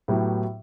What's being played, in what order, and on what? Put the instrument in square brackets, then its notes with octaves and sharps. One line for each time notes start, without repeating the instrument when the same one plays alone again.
[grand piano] A2 F#3 B3 E4 G4